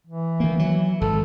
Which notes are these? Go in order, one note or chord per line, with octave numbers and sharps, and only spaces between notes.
E3
D#3 A#3
F#3
G#1 A4